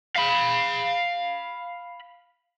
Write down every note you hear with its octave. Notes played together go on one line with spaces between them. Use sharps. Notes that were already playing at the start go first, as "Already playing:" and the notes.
F5 B5